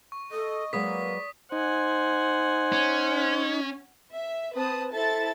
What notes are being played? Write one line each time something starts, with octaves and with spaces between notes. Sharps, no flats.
C#6
A4 D#5
F#3 G#3 A#3 B4 D5 D#6 B6
D#4 C5 F#5 G#5
C#4
E5
C4 B4 A5 D#6
E4 A4 C5 E5 A5 A6